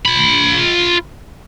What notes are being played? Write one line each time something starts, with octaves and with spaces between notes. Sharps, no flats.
F4 B5